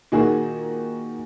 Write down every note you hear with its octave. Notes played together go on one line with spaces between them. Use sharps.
A#2 D#3 D#4 F#4 G#4